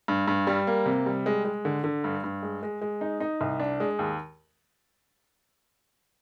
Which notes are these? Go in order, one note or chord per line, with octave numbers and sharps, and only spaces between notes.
G2
G2
G3
A#3
C3
G3
G#3
G#3
D3
D3
G2
G2
G#3
G#3
G#3
D#4
D#4
C2
D4
G#3
D#2